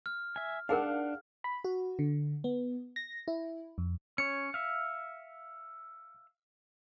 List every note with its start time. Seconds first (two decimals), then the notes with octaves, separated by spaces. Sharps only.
0.06 F6
0.36 E5 G#5
0.69 D4 D#4 G#4 A#4 F5 F#5
1.44 B5
1.64 F#4
1.99 D3
2.44 B3
2.96 A#6
3.28 E4
3.78 F2
4.18 C#4 C#5 C#7
4.54 E5 F5